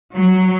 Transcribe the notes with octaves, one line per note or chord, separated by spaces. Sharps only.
F#3